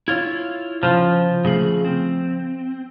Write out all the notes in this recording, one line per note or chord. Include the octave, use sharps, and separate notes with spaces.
E4 F4 C#5
C#3 F3 F4
C#3 A3 G#4
C4